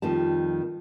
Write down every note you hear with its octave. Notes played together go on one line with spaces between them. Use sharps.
F2 D#3 G3 A5